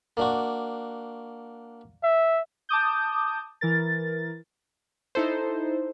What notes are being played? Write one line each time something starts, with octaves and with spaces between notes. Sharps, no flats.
A#3 D4 F#4
E5
A5 D6 D#6 G6
E3 A#4 A6
D#4 E4 A4 C5